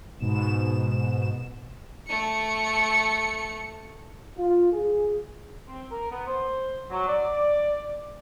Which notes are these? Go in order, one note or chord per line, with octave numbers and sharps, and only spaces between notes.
G#2 B2 E7
A3 C#7
F4
G#4
C4
A#4
B3
C5
F#3
D5